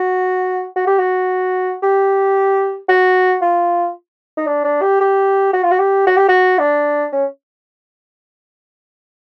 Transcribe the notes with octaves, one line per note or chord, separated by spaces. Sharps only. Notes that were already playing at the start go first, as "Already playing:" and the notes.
Already playing: F#4
F#4
G4
F#4
G4
F#4
F4
D#4
D4
D4
G4
G4
F#4
F4
F#4
G4
F#4
G4
F#4
D4
C#4